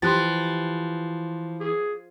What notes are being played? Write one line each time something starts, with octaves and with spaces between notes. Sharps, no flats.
E3 F3 G4 C6 F#6 A6
G#4